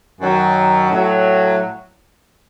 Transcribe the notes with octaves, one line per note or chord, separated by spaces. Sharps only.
F#2 D#3 F#3
A2 F#3